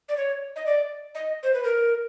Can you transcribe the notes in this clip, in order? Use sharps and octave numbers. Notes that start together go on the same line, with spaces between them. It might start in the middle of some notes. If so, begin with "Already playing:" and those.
D5
C#5
D#5
D5
D#5
C5
B4
A#4